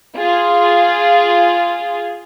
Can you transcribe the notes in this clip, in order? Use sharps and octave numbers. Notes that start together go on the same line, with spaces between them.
F4 G#4